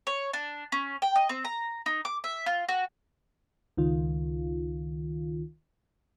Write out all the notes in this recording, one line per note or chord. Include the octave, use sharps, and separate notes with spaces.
C#5
D4
C#4
G5
D#5
C4
A#5
D#4
D6
E5
F4
F#4
C#2 D#3 F4